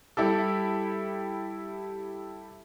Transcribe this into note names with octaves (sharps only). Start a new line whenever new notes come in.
G3 E4 G4 A4